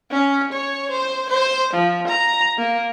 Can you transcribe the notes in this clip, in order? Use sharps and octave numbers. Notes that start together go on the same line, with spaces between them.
C#4
C#5
C5
C5
F3
A#5
A#3